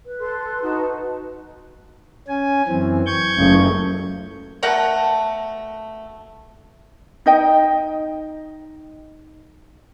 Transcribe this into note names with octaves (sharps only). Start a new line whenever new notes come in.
B4
A4 C6 F#6
D#4 F#4 A5
C#4 G#5
F#2 E3 C4
C#6 G6 G#6
F#1 C#2 A3
B2 A3 A#4 F#5
D#4 D#5 G5